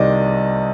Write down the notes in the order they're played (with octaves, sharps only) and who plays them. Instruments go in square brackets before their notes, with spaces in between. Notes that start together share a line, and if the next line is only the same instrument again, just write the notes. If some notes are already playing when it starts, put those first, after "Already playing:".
Already playing: [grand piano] C2 C3 D#3 D5 D#5